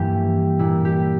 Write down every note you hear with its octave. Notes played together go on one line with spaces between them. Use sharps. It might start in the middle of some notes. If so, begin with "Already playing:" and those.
Already playing: G2 E3 A#3 G4
A#2 E4
G4